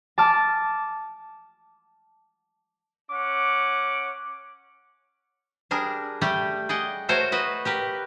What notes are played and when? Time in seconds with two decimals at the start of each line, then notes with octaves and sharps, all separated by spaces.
0.18 A5 D6 F6
3.11 C#4 F#5 D6
5.71 G3 D4 G#4 A#4
6.21 G3 A3 G4 D5 G5
6.69 G#4 D5 D#5 F#5 G5
7.09 A3 F#4 A#4 C5 C#5
7.32 F#4 B4 D#5
7.65 G4 A#4 B4